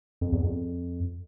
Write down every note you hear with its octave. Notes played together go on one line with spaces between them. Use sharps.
F2
E2
F2